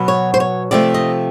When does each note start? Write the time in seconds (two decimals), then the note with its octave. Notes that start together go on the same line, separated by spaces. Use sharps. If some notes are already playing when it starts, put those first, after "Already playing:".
Already playing: B2 F#3 B3
0.08 C#5
0.34 C5
0.40 C#5
0.71 C3 F3 A3 D5
0.94 D#5